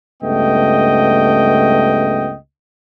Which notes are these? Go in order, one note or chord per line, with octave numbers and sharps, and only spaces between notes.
C#2 G2 A3 B3 D#5 G5